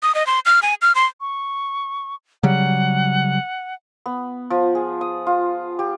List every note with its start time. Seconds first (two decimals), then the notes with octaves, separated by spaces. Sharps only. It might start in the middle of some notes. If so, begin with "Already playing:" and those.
0.03 D#6
0.15 D#5
0.27 C6
0.46 F6
0.62 G#5
0.82 F6
0.95 C6
1.21 C#6
2.43 C#3 F#3 G3 F#5
4.06 B3
4.50 F3
4.75 G#4
5.01 D#6
5.27 F4
5.79 G4